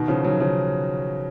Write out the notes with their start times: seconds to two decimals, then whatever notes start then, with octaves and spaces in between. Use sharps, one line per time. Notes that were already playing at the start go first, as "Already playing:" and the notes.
Already playing: B2 D#3
0.08 C#3 F3
0.25 D#3 F#3
0.40 C#3 F3